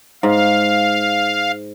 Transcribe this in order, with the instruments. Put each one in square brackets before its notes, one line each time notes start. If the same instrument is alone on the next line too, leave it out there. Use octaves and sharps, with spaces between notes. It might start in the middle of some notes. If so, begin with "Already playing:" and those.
[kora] G#2 [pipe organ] F5